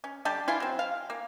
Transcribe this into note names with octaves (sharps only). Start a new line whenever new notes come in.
C#4
D3 G3 G4 A5
E4 F4 G#5
F#3 C4
F5
A#3